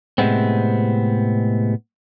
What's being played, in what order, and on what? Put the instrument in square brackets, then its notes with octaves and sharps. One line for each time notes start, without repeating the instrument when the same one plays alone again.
[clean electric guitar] A2 C3 D#3 G#3 B3 C4